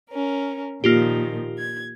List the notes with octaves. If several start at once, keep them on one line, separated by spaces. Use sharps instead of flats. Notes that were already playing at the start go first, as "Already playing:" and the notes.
C#4 A#4
A#2 D#3 F3 A#3 F4 G4
G#6